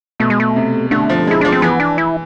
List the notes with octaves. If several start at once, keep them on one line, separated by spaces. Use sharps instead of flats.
B2 A3
G#3
A3
C3
D3 A3
F3
G#3 E4
F3 D4
C4
E3 B3
D4
E4